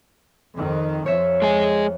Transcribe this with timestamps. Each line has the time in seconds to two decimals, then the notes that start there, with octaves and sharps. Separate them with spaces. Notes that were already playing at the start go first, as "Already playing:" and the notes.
0.56 F2 D#3
1.06 F2 F3 C#5 E5
1.42 G#3 G#4